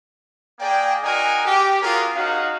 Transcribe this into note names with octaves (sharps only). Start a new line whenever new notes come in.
A#3 G#4 D5 G5
D#4 F#4 G#4 A#4 G#5
G4
C#4 F4 F#4 G#4 A#4
C#4 D#4 F#4 F5